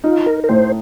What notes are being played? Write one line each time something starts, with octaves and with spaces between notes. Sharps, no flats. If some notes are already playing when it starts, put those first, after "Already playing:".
D#4 F4
A#4
A#4
A2 C5